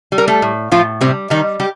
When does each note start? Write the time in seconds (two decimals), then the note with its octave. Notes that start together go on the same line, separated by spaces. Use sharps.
0.12 G3
0.18 A#4
0.28 A3 A4
0.42 A2
0.71 A2 F3 F4
1.01 C3 G3 C4
1.30 D#3 G3 D#4
1.60 G3 G4